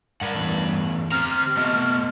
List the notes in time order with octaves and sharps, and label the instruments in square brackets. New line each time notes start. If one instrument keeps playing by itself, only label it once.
[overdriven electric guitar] G2 B4 [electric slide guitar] A#4 F#5
[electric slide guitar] E2 A2
[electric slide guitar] C4 [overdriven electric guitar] G4 A#5 [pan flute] F6
[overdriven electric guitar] A3 F4 [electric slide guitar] B3 D#5